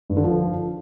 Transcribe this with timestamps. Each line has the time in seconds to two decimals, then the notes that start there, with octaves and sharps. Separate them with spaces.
0.10 G2
0.17 D3
0.24 F3